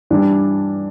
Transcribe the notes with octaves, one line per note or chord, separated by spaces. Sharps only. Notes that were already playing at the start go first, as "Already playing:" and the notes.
G2 E3 G3 D4